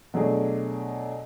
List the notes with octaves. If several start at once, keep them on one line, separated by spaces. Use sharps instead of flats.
B2 F#3 A3 D4 G#4